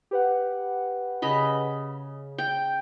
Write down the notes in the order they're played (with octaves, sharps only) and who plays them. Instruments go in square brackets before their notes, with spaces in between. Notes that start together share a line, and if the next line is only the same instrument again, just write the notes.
[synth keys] G4 B4 F#5
[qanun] C#3 D#5 B5
[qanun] G5 [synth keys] G6